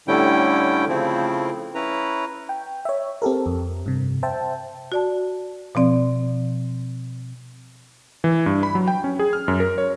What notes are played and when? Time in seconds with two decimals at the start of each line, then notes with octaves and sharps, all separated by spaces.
0.08 A2 D3 G3 C#4 E4 G5
0.88 C#3 F3 A3 C4 E4
1.75 C#4 E4 B4 A#5
2.49 G5
2.85 C#5 E5
3.22 C4 G4 A4 A#4
3.46 F2
3.86 G2 C3
4.23 C5 E5 G5 A5
4.92 F#4 D5 A5
5.75 B2 F3 C4 D5
8.24 E3
8.46 G2
8.63 B5
8.75 F#3
8.88 G5
9.04 C#4
9.19 G#4
9.33 F6
9.48 F#2
9.60 A#4
9.78 C#5